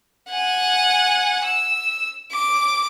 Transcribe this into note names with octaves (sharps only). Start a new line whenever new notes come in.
F#5 G#5
E6
D6